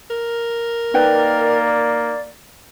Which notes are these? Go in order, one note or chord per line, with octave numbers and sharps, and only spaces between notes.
A#4
A#3 D#4 B4 D5 G5